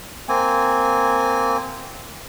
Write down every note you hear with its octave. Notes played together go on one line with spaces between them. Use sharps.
A#3 C4 G#5